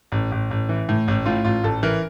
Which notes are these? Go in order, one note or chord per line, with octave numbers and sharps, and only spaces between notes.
A1
A1
A1
E3
A2
A1
A2 F4
A1 F4
A1 A4
E3 A#4